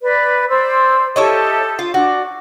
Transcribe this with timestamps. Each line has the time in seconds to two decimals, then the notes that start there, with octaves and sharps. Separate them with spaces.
0.01 B4 D5
0.49 C5 D5 E6
1.16 E4 G4 A4 C#5 D#5
1.79 F4
1.94 D4 F#4